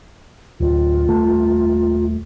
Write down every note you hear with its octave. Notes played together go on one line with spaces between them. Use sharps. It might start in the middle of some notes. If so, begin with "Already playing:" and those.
D1 F4
D#1 A3